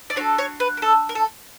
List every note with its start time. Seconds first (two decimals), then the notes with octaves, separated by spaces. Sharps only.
0.10 D5
0.16 D4 F#4 A4 C#5
0.38 C#5
0.60 B4
0.77 A#4
0.82 A4
1.09 A#4
1.15 A4